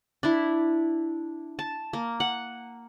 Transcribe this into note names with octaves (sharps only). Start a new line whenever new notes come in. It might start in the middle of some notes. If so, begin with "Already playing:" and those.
D4 E4
A5
A#3
F#5